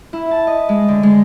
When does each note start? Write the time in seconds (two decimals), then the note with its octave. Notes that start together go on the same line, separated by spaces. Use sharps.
0.13 E4
0.31 A5
0.47 D#5
0.69 G#3
0.88 D3
1.03 G#3